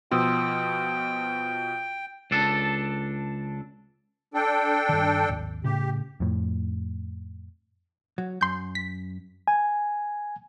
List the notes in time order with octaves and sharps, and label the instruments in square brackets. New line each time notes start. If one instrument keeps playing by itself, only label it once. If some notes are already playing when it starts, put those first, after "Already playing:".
[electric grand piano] B2 F3 [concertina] G5 [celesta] C6 D#6 E6
[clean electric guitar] C#2 D4 A4
[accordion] D4 A4 G5
[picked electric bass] G2 D#3
G#1 D#2
[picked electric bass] A2 C#3 [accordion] G4
[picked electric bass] F2 A2
[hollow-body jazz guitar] F#3
[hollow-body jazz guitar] F#2 [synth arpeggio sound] C6 G6
[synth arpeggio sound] B6
[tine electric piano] G#5